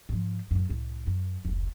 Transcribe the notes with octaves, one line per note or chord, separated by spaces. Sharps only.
G#2 F3
F#2 A2
C2 A2
F#2
F1 C#2